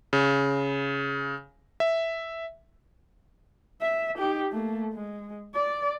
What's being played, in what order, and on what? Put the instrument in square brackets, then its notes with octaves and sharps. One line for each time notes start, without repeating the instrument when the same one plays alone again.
[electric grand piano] C#3
E5
[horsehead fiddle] E5
D#4 G4
A3 A#3
G#3
D5